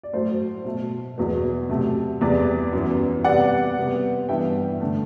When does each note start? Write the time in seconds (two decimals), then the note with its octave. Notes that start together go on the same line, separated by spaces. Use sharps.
0.03 D5
0.13 A2 F#3 A3 A4 C5
0.65 B2 A3
1.18 E2 B2 F#3 B3
1.69 C3 F#3 A3
2.21 E2 C3 G3 B3 B4 D5
2.73 F#2 E3 B3
3.24 C3 G3 B3 D5 F#5
3.76 C3 G3 B3
4.29 G2 E3 B3 E5 G5
4.80 D3 A3